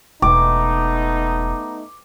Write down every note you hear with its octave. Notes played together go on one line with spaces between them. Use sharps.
E1 A3 B3 D#4 D6